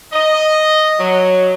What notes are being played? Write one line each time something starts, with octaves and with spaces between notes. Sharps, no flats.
D#5
F#3